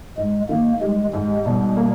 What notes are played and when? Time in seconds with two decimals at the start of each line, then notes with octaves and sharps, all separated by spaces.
0.17 G#2 G#3
0.49 D#3 A#3
0.81 G3 G#3
1.13 G#2 G#3
1.45 B2 G3
1.77 A#3